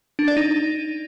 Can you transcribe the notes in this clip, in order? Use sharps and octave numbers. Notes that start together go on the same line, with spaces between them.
D4
D5
D#4